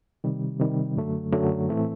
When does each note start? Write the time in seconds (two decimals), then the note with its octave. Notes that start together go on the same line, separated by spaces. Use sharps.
0.24 C3 D#3 G3
0.60 C3 D#3 G3
0.96 F#2 D3 F#3 A3
1.32 F#2 D3 F#3 A3
1.69 A2 E3 A3 C4